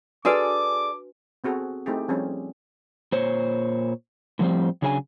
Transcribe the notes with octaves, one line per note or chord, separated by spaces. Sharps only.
D4 F#4 G#4 A4 B4 D5 D6
B3 C4 F#4 G#4 A4
A3 C4 D#4 E4 G4 G#4
F3 G3 C4 C#4 G#4
A#2 C5 C#5
A2 F3 G3 C4
C#3 F#3 D4 G#4 D#5 G#5